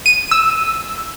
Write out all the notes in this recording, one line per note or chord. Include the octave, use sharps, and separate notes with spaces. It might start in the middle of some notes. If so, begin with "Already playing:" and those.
D#7
E6